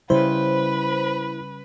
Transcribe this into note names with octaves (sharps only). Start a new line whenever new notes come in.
C#3 G3 E4 B4 C5 B5